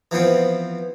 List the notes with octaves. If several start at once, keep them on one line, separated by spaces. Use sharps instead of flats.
E3 F3 B3 C4